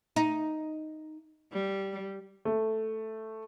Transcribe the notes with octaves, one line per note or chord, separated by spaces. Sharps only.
D#4
G3
A3